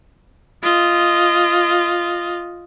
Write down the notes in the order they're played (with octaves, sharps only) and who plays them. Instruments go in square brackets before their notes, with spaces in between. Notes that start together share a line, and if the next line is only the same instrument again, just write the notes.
[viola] F4 D#5